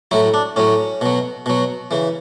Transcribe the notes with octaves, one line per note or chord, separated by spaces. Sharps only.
A2 F#3 E4
D4
A2 F#3 C#4
B2 F#3
B2 F#3
C#3 E3